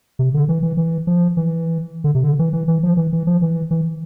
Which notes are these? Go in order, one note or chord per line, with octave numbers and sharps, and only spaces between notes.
C3
D3
E3
E3
E3
F3
E3
D3
C3
D3
E3
E3
E3
F3
E3
E3
F3
E3
E3